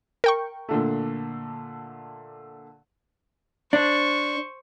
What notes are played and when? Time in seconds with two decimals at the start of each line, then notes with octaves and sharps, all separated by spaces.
0.24 A#4 G5 C#6
0.68 A#2 D3 A3
3.73 D4 C5 C#6